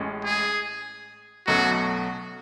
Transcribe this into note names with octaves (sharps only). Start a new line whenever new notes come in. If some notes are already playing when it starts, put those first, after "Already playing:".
Already playing: A1 A2 G#3 C#4
G#4
B1 B2 F#3 A3 C#4 F#4